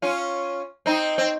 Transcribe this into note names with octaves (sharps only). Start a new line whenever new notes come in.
C#4 F4
C4 D#4
C4